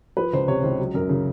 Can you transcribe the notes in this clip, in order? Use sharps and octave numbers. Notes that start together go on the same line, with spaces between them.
F3 B4
C#2 C5
C3 C#5
C#2 C5
F#3
F#2 A#4
C#3